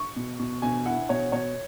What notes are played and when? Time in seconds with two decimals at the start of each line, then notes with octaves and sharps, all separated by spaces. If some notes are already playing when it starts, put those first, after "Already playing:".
Already playing: C#6
0.16 B2
0.40 B2
0.62 B2 G#5
0.86 E4 F#5
1.09 B2 C#5
1.32 B2 C#5